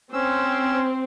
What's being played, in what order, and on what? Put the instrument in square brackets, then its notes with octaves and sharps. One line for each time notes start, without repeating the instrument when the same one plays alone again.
[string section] C4 [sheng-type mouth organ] C#4 E6